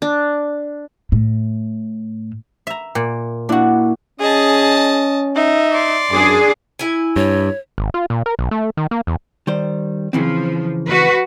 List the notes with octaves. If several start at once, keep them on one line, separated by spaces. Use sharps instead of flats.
D4
A2
E5 A#5
A#2
A#3 D4 E4 F#4
C#4 G#4 D#5 A5
D#4 E5
D5 C6
F#2 D4 G#4 D6
E4 G#5
G2 C#5
G#1
F4
A#2
A#4
B1
A3
D#3
A#3
E2
D#3 G3 C5
C#3 E3 F3 C4
F#4 B4